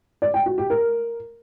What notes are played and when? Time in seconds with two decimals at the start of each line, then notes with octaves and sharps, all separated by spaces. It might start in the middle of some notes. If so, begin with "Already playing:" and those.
0.22 D5
0.34 G5
0.46 F#4
0.58 G4
0.70 A#4